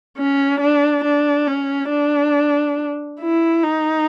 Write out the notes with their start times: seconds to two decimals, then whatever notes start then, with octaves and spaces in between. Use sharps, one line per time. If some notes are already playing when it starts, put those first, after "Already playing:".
0.18 C#4
0.60 D4
1.04 D4
1.47 C#4
1.91 D4
3.21 E4
3.63 D#4